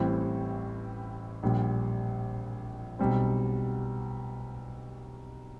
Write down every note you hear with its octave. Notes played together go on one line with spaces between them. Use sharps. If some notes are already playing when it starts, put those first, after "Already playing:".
Already playing: A1 A2 E3 G3 C4
A#1 A#2 G3
B1 B2 G3 C4